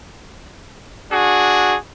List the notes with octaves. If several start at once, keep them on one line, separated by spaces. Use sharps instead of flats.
D4 F#4 G#4